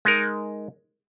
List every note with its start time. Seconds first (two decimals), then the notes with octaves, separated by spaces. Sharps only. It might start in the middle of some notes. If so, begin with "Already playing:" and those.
0.05 G#3 D#4 A#4